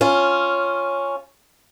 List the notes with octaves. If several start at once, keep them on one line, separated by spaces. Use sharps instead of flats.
C#4 F4